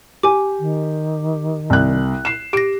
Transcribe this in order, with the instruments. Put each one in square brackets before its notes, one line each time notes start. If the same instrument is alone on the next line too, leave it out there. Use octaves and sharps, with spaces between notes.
[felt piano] G4 [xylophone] G#5 D6
[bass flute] D#3
[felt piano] C2 F#6
C7 E7
[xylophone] G4 A#6 [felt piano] D7